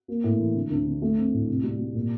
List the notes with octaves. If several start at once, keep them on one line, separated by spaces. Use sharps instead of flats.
A#3
A2
E3
D3
D2
D3
A3
C4
A2
C2
G3
G3
A#2